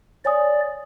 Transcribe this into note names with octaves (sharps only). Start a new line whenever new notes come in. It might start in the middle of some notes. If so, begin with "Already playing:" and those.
C#5 D5 G#5 D#6